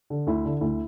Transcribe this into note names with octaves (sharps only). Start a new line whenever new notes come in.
D3
D2 E4
D3
D2 E4